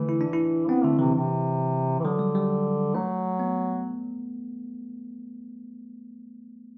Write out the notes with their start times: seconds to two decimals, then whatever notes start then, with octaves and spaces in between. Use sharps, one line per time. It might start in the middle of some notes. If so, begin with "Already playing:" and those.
Already playing: D3 E3 A3
0.09 E4
0.21 D4
0.33 E4
0.68 B3 C4
0.84 D3 A3
0.99 C3 E3
1.14 C3
1.99 E3
2.04 D3 F#3
2.19 G3
2.35 G3
2.95 F#3 A3
3.40 B3